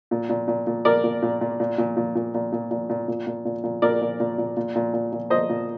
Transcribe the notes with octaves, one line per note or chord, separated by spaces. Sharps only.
A#2
A#2
A#2
A#2
A#2 A#4 D5
A#2
A#2
A#2
A#2
A#2
A#2
A#2
A#2
A#2
A#2
A#2
A#2
A#2
A#2
A#2
A#2 A#4 D5
A#2
A#2
A#2
A#2
A#2
A#2
A#2
A#2 C5 D#5
A#2